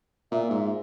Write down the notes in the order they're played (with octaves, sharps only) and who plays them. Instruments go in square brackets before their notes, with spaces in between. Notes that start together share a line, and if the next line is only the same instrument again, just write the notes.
[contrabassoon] A#2 [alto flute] E5
[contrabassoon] G#2